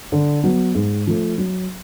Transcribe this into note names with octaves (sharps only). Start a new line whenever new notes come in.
D3
F#3 B3
G#2
F3 A3
F#3